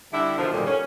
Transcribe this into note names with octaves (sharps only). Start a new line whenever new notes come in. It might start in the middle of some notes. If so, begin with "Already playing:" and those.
D3 G3 D4 E4
B2 D3 D#3 F3
G2 A#2 D3 D#3 F#3 G3
C#4